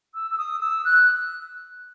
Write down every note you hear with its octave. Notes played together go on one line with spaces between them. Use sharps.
E6
E6
D#6
E6
F#6